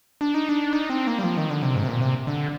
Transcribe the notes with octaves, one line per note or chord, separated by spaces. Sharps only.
D4
D#4
D4
D#4
C4
A#3
G3
F3
D#3
D3
C3
G#2
C3
A#2
C3
D3